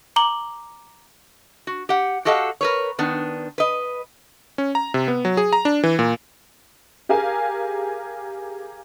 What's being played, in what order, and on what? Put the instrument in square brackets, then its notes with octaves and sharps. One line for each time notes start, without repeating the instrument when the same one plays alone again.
[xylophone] A#5 D6 F#7 G7
[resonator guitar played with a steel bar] F#4
G4 F#5
F#4 G4 A4 D#5 F5 F#5
A#4 B4 C#5
D#3 B3 D4
B4 D#5
[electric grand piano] C#4
A#5
C3
B3
F#3
G#4
A#5
D4
E3
A#2
[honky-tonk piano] G4 G#4 A#4 F5 G#5